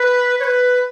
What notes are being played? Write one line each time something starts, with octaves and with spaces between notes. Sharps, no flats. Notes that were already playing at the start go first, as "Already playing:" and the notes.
Already playing: B4
C#5
B4